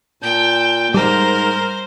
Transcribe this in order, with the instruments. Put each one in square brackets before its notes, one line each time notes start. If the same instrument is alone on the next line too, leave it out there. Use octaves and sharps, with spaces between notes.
[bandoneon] A#2 G6 [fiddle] G5 A5
[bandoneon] G#2 [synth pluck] G3 [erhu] A#4 [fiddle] C5